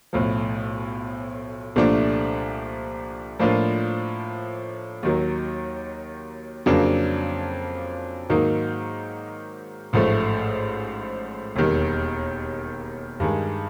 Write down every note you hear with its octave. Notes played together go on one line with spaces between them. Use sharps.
B1 A2 F3
C2 A#2 F3 A3 D4
A2 F3 A#3 D4 F4
D#2 D#3 F#3
F2 C#3 F#3 A#3 D4
G#2 D#3 F#3 A#3 D#4
A1 G#2 F3 A3
E1 D#2 D#3 G3
G2 D#3 G#3